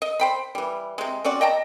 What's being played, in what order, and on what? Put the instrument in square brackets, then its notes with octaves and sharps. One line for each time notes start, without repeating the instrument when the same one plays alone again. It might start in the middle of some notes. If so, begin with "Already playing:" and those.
[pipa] D#5
C5 G5 B5
E3 G3
C3 G#3
C4 C#4 F#4 D5
D#5 G5 A5 A#5